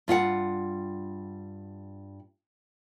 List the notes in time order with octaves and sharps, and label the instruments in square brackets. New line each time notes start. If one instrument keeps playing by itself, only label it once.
[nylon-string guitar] G2 F4 F#4 F#5